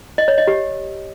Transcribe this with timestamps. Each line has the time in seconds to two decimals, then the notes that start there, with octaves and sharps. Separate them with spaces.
0.18 D#5
0.28 C#5
0.38 D#5
0.47 G4